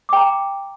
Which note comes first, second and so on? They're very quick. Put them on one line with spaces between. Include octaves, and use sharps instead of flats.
D6 G5 A#5